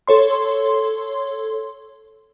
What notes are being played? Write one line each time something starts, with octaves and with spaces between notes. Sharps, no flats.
A4 C#5 C6